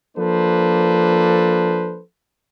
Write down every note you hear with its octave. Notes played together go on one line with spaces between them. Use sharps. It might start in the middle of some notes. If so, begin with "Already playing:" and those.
F3 A#3 D4 A4 B4 C5